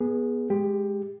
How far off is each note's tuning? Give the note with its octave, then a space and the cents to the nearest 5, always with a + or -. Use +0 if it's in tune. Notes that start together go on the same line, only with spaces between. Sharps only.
B3 -20 G#4 +0
G#3 +0 G4 +15